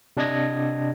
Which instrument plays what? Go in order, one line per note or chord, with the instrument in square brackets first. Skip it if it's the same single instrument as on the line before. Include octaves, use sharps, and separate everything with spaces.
[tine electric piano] C3 D4 D5 D#5 G#6 A#6